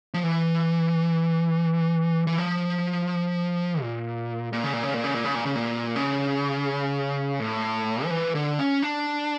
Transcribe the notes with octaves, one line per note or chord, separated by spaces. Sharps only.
F3
E3
E3
F3
A#2
A#2
C#3
A#2
C#3
A#2
C#3
A#2
C#3
A#2
C#3
A#2
C#3
A2
F3
E3
D3
C#4
D4